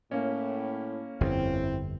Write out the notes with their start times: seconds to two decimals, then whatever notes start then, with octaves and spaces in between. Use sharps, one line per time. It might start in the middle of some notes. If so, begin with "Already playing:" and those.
0.11 A2 A#3 C#4
1.21 G1 F2 C4 E4